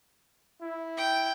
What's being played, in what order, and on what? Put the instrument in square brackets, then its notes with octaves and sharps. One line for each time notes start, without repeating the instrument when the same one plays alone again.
[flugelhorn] E4
[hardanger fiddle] G5